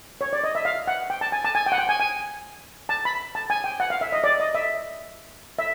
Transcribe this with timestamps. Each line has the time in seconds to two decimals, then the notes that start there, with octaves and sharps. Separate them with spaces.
0.21 C#5
0.33 D5
0.44 D#5
0.55 E5
0.65 F5
0.87 F#5
1.10 G5
1.21 A5
1.32 G#5
1.45 A5
1.55 G#5
1.66 G5
1.72 F#5
1.78 G5
1.89 G#5
2.00 G#5
2.89 A5
3.05 B5
3.35 A5
3.50 G#5
3.64 G5
3.80 F#5
3.90 F5
4.01 E5
4.12 D#5
4.24 D5
4.40 D#5
4.55 E5
5.59 E5